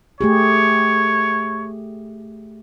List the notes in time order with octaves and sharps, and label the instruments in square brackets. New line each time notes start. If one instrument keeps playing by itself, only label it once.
[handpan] A3 G4 G#4 [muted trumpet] C#5